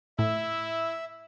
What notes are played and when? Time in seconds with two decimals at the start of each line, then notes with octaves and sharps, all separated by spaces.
0.19 A2 E4 E5